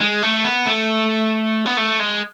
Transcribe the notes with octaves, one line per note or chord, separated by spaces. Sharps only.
G#3
A3
B3
A3
B3
A3
G#3